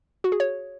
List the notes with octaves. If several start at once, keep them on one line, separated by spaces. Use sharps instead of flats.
F#4
G#4
C#5